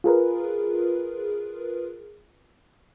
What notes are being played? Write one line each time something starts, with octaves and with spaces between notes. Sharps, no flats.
F4 G#4 A#4 B4